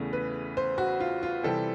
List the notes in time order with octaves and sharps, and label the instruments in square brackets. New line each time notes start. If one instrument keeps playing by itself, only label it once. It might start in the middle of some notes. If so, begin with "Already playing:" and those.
Already playing: [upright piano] E2 C#3 E3 A3
B4
C5
F#4
F4
F4
C3 E3 G3 C4 A4